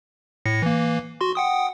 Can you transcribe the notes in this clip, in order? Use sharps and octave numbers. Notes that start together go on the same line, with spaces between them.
A2 A#6 C#7
E3 A#3
F#4 C6
F#5 G5 D#6